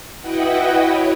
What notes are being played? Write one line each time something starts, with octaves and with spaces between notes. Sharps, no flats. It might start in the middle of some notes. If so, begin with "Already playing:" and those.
E4 F#4 B4 D#5 F#5 G5
C#5